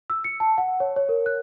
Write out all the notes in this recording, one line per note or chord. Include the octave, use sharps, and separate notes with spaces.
E6
C#7
A5
F#5
C#5
C#5
A#4
F#6